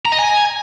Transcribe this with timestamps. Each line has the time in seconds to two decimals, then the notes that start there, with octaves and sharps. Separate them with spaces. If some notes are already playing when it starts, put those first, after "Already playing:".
0.05 A#5
0.12 D#5
0.19 G#5